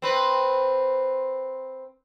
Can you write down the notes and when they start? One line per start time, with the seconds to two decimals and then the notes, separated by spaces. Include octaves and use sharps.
0.02 C4 B4